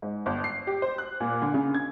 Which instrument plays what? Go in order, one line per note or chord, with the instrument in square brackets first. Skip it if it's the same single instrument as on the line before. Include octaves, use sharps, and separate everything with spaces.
[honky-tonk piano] G#2
G1
C7
G4
C5
F#6
A#2
D3
C#3
G#6